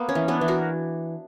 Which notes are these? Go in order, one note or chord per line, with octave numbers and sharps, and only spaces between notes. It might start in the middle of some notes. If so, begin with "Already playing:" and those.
Already playing: A#3 B3
C#4
E3
B3 D4
E3
F#4 A#4